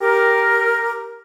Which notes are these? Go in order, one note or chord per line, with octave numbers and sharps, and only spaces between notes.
G4 A#4